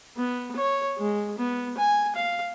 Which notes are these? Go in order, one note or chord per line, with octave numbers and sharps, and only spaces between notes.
B3
C#5
G#3
B3
G#5
F5